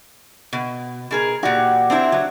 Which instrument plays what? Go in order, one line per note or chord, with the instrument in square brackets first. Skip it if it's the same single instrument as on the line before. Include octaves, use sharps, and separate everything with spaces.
[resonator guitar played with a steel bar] B2
B2 G#4 A#4
[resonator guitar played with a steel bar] A#2 F#4 [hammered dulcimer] G4 D5 F#5
[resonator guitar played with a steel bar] C4 D4 E4
F#3